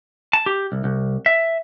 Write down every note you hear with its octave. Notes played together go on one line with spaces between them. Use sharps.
A5
G4
C2
C2
E5